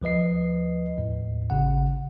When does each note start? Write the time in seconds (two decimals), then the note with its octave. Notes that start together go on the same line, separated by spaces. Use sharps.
0.02 D2 F3 B4 D#5 C7
0.98 D#2 A2
1.50 G#1 C#3 F#5